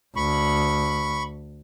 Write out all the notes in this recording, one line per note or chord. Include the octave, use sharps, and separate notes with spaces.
D2 B5 C#6